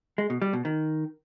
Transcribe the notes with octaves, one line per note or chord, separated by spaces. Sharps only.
G#3
B2
G3
B2
D#3